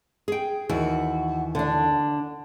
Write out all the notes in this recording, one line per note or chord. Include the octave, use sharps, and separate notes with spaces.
G#4 G5
D#2 E3 F#4
D3 D4